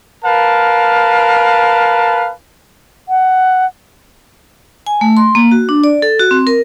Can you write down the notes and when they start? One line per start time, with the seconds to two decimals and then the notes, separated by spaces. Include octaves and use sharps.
0.25 A#4 B4 F5 A5
3.09 F#5
4.87 G#5
5.01 A3
5.17 C6
5.35 A#3
5.52 F#4
5.69 D4
5.84 D5
6.02 A4
6.19 F#4
6.31 C4
6.47 A#4